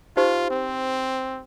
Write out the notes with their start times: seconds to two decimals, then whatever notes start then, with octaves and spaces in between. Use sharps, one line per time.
0.17 D#4 F4 G4 C5
0.51 C4